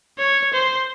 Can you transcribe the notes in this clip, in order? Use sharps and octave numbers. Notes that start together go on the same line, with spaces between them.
C#5
C5